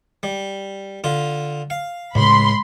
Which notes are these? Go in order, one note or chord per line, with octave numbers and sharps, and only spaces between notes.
G3
D3 F4
F5
C#2 A2 C#3 B5 C6